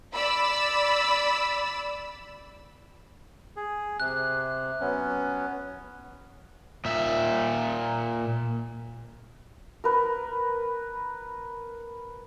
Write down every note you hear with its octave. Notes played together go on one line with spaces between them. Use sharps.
D5 B5 E6
G#4
C3 F#6
F#3 B3 C#4
A#2 E5
A#4 B4